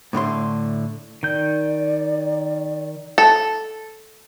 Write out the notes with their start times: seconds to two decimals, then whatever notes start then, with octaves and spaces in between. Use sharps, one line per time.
0.13 A2 D3 A3 C6
1.23 D#3 D5 G6
3.18 A4